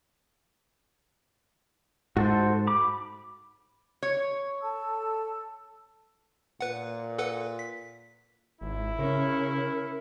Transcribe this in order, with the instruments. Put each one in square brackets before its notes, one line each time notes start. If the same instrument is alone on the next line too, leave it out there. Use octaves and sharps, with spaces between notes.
[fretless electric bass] G#2 [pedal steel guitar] F#4 A4 C5
[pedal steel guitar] B5 D6
[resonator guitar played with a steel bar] C#5
[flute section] A4 A5 E6
[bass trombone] A#2 [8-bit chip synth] B4 F#5
[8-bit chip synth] A4 B4 F#5
B6
[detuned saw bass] G#1 [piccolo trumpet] E4
[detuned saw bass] C#3 [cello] C#4 [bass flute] A#4